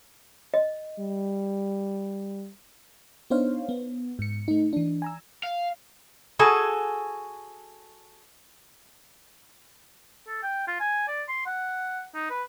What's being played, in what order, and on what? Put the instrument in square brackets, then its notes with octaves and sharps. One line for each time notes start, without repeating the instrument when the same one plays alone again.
[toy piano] D#5
[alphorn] G3
[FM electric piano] B3 D4 D#4 C5 C#5 F5
B3
G#2 C#7
A3 D#4
E3 D4
G#5 A#5 E6
[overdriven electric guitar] F5
[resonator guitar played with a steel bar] F#4 G#4 A4 G#5
[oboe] A4
G5
F4
G#5
D5
C6
F#5
D#4
B4